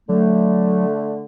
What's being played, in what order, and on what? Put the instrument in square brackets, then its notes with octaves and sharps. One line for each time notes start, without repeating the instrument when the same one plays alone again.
[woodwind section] D3 A3 [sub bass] F#3